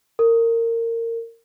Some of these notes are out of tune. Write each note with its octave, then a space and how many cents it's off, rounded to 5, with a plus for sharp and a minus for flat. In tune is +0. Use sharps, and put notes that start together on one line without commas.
A#4 -25